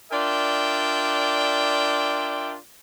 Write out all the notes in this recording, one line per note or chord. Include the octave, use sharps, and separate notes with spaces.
D4 F4 A#4 D5 E5 G5